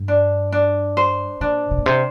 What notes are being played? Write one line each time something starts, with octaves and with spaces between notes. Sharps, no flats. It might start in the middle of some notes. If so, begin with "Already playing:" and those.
Already playing: G2
D4
D4
C5
A#2 D4
C3
A#2
C3 C5